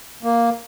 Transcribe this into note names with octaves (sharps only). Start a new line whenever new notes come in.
A#3